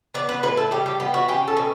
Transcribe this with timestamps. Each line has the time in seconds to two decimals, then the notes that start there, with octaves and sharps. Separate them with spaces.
0.14 B3 D5
0.29 B4
0.43 A2 B4
0.57 A4
0.71 G3 G4
0.86 G4
1.00 B3 G4
1.14 F#4
1.28 C#4 G4
1.48 A4
1.57 B2